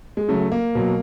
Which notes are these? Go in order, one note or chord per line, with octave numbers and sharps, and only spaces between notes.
G#3
C#3 F#3 A3
A#3
B2 F#3